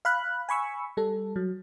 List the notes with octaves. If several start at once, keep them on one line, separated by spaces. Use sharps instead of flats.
F5 B5 F#6
G#5 B5 C#6 E6
G3 A4
F#3